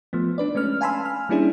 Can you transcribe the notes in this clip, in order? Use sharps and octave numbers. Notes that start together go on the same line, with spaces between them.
F3 A3 B3
D4 B4 D5
G#3 A3 C#4 B4 F6
F5 G#5 A5 B5 C6 E6
F6
G3 A#3 C#4 D4 E4 G#4